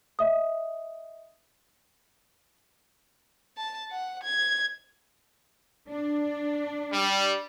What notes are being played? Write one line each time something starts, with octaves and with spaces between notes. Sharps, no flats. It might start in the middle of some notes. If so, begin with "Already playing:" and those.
D#5 E5 D#6
A5
F#5
G#6
D4
G3